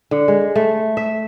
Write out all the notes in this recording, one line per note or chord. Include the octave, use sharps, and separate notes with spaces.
D3
G#3
A3
E5